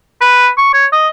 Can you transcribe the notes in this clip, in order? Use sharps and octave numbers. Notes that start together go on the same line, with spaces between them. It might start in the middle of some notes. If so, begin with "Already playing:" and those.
B4
C#6
C#5
D#5